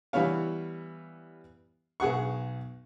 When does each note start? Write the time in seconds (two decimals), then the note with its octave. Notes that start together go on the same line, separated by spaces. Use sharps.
0.13 E3 G3 B3 C#5 F5
2.00 B1 G#4 F#5 C#6